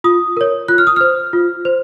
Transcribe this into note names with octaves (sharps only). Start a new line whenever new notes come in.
F4 D#6
A#4 C#5
F4 F#6
F6
D#6
C5 F6
F4
C5